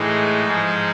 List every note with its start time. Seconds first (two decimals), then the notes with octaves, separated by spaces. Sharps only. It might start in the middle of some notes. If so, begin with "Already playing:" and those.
Already playing: A2 E3 G#3 D#4
0.44 G#2 F3 G#3